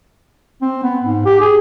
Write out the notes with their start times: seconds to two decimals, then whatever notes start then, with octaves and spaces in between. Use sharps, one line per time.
0.61 C4
0.83 B3
1.03 G#2
1.25 G4
1.40 G#4